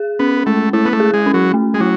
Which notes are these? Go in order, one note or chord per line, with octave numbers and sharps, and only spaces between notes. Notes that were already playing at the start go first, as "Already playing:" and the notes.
Already playing: G#4
B3 C#4
G#3 A3
A3 E4
B3
A3
G#4
G#3
C#4
F#3
A3
G#3
F#3 E4